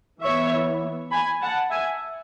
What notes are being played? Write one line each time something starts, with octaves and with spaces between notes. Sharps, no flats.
E3 B3 C#5 E5
G#5 B5
F#5 A5
E5 G#5